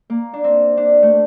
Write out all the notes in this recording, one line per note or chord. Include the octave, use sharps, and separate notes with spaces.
A#3
D4
C4
D4
A3